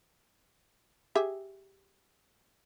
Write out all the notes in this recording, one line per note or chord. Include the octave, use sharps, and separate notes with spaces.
G4 G#4 E5